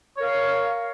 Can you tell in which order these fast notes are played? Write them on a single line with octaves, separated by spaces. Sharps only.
C#5 A#4 F5